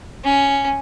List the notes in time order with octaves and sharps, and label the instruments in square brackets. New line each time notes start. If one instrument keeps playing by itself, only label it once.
[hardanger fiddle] C#4